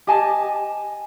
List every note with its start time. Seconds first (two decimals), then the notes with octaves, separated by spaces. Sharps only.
0.07 G4 D#5 G#5 A5